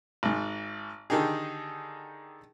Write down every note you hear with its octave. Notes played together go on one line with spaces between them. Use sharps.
G#1 G#2
D3 D#3 D#4 G4 G#4